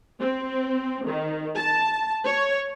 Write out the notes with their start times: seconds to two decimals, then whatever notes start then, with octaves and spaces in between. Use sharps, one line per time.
0.20 C4
1.07 D#3
1.56 A5
2.24 C#5